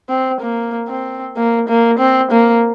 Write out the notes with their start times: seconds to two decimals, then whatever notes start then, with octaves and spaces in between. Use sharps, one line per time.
0.09 C4
0.41 A#3
0.89 C4
1.37 A#3
1.69 A#3
1.99 C4
2.32 A#3